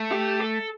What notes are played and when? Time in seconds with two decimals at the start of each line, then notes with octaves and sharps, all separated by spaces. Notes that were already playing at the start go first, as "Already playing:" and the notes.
Already playing: A3
0.12 G4
0.41 A4